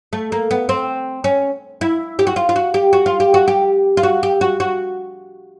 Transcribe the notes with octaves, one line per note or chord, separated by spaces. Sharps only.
A3
A#3
B3
C4
C#4
E4
G4
F#4
F4
F4
F#4
G4
F#4
F4
G4
F#4
G4
F4
F#4
G4
F#4
F#4